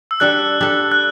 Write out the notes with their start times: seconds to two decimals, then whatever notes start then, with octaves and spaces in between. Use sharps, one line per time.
0.11 E6
0.20 G3 D4 A4 F#6
0.61 G3 D4 A4
0.92 F#6